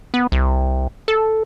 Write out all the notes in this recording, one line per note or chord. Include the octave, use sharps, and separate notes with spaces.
B3
C2
A4